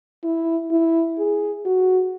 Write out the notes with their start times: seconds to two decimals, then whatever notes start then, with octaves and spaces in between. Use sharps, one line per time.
0.24 E4
0.71 E4
1.19 G#4
1.66 F#4